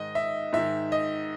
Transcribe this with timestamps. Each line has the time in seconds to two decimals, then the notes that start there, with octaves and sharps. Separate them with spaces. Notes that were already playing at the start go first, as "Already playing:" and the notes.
Already playing: G#2 D#3 D#5
0.15 E5
0.53 G#2 D#3 E5
0.92 D#5